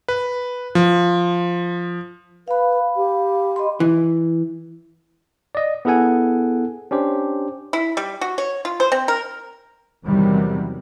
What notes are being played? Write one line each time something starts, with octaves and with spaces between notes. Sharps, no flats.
B4
F3
B4 F5 B5
G4
D#5 B5 C6
E3
D5 D#5
B3 E4 G#4 A4 F#5 G#5
C#4 D4 G4 C5
E4
G3
F#4
C#5
F4
C5
C4
A#4
E2 C3 D#3 E3 F#3 G3